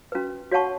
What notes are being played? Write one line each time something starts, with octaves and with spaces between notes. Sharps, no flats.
C#4 F#4 B4
F#4 C#5 F#5 A5 C#6